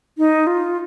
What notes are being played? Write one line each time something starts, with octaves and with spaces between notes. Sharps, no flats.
D#4
F4